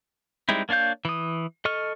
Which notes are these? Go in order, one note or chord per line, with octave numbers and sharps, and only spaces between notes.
G3 G#3 C4 D#4 E4
A#3 D4 C#5 F5 G6
E3 D#6
A4 D#5 C#6 F6